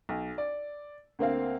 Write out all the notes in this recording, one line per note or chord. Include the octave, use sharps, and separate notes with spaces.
B1
D5
D2 A#3 C4 F5